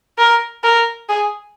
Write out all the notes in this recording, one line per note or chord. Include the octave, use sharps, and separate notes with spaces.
A#4
A#4
G#4